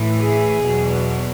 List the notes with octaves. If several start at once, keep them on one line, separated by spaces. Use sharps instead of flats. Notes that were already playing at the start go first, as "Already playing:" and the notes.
Already playing: A2 E3
G#4
E2 B2 F#3